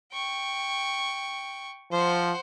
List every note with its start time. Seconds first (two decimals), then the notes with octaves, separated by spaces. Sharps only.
0.13 G5 C#6
1.92 F3 C5 F#5